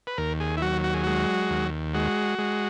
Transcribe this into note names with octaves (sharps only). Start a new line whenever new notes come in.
B4
D#2 A#4
G#4
E4
F#3 F#4
F#4
G#4
G#3 F#4
D#2
G#3 F#4
G#3